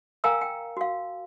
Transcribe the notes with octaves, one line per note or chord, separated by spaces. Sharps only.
A#4 F5 G5 G#5 A#5 E6
G5
F#4 F5